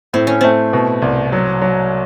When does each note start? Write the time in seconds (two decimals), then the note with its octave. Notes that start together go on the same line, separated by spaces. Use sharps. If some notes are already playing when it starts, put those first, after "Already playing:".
0.13 A2 C4
0.27 C#4
0.41 A3 C4
0.73 B2
1.02 C2
1.32 F#3
1.61 F#3